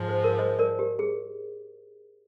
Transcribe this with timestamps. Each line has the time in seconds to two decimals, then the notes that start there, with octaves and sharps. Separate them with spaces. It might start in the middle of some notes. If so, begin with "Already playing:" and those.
Already playing: G#2 F3 G#3
0.09 C5
0.24 A#4
0.38 C5 D#5
0.59 A#4 D5
0.79 G4
0.99 G#4